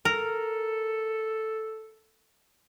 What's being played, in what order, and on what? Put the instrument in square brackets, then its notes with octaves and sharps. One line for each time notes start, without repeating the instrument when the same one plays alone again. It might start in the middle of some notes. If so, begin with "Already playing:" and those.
[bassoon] A4 [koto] A#4